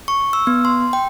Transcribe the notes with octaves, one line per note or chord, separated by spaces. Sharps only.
C#6
E6
B3
C6
G5